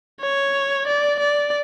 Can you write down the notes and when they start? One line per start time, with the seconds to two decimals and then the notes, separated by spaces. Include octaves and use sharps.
0.21 C#5
0.87 D5
1.20 D5